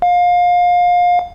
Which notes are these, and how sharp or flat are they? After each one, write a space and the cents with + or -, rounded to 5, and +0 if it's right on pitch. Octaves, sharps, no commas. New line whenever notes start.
F5 +25